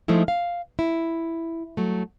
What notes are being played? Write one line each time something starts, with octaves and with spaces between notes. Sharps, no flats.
F3 G#3 A3 D#4 E4
F5
E4
F#3 A3